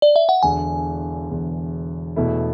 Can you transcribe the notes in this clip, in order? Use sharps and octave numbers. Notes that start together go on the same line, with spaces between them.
D5
E5
F#5
E1 E2 D3 G#5
E1 E2 D3
E1 E2 B2 A3 E4